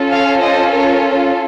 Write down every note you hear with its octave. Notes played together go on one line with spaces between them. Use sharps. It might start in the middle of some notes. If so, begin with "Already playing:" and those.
Already playing: C#4 F4 A4
C#5 F5
C5 D#5
A#4 C#5